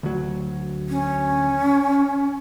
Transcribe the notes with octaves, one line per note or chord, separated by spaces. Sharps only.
D2 F#3
C#4